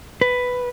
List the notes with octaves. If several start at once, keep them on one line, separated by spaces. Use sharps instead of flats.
B4